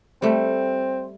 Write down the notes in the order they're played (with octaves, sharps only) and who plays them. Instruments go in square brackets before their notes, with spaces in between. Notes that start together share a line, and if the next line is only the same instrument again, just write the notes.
[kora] G3 A3 [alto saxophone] C4